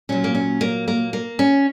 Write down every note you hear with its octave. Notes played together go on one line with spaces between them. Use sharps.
A#2 F#3 C#4
A#3
C#4
A#3
A#3
A#3
C#4